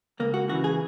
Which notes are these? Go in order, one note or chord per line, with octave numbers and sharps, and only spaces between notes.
C#2 A#3
F#4
C#3 E3 F#4
G#4